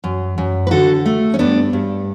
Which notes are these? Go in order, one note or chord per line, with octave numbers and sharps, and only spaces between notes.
F#2
F#2
B4
D3 F#4 A4
A3
C#4
G2 B3 D4
G2